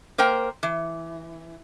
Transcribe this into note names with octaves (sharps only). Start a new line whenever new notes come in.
A#3 A#4 C5 G5
E3